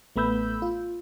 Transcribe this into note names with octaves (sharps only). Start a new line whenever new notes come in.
A1 A3 B3 B5 E6 G6
F4